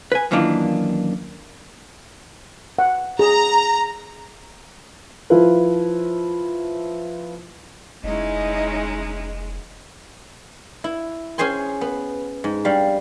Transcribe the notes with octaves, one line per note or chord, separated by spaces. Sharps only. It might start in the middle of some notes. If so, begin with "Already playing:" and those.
B4 G#5
F#2 D#3 E3 A#3 D4 F4
F#5
G#4 A#5
F3 E4 F4 B4
F1 G#3 C#4 D#4 E4 D#5
E4
C#4 G#4 C5 G#5 C6
B3
G#2
G2 G3 F5